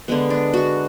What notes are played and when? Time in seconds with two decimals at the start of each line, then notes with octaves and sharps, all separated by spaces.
0.08 D3 G#3 B3
0.30 D4
0.54 F#4